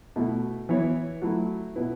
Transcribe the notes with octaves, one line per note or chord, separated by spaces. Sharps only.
B2 A3 E4
E3 B3 E4 C#5
F#3 A3 E4
B2 B3 E4 B4